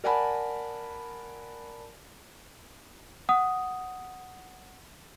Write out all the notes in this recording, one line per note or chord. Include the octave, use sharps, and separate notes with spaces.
A#4 D5 F#5 G#5 A5 B5
F#5 D#6